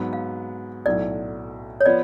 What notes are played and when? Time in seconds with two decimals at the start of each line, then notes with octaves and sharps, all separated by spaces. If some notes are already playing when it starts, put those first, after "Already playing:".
Already playing: G#2 F#3 B3
0.13 F5
0.86 B1 A2 F#3 D5
1.81 C#5
1.86 F3 B3 F4 D5